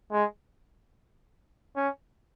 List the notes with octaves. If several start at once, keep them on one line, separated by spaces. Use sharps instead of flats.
G#3
C#4